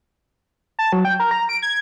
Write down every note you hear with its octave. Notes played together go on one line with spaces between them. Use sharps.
A5
F#3
G5
A#4
A#5
D7
G#6